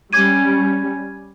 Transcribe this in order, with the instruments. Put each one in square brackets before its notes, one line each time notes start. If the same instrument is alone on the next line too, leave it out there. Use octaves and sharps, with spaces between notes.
[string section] G3 C#4 [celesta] D6 G#6 D#7